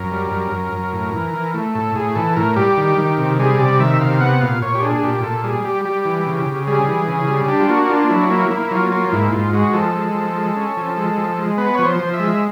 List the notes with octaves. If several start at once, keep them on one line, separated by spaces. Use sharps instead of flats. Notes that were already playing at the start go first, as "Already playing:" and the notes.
Already playing: F#2 A#4
G3
F#2
F#2
F#2
A2
E3
E3
A3
A2 A4
A2 G#4
E3 A4
A2 A#4
G3 G4
D#3
D#3
C3
G3 G#4
C3 D5
D#3 E5
C3 F5
B3 F#5
A#2 F5
A#2 C#5
G4
D4 G#4
G#4
A#2 G4
A#2 A4
G3 G#4
G3 G4
G3 G4
E3
C#3
C#3
G3 G#4
E3
C#3
G3
D4 G4
F4
A#3 F#4
D4 F4
F#3 E4
A#3 E4
A#3 E4
E4
F#3 F4
A#3 F4
G#2 E4
G#2 F4
G#3 F#4
F3 A4
G#3
F3
G#3
C#4
F3
G#3
F3
G#3
B3 B4
F3 C#5
C5
F3
E5
G#3